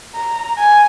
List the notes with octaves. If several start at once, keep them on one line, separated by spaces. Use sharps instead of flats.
A#5
G#5